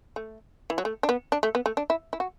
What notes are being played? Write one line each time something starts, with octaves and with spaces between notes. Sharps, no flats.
A3
E3
F#3
A3
D4
B3
D4
A3
B3
A3
D4
E4
E4
F#4